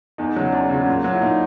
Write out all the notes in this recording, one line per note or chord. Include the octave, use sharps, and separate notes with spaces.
E2 D#4
C#3 F#3
E2 D4
C#3 F#3
A#2
F#3
E4
A#2 D#4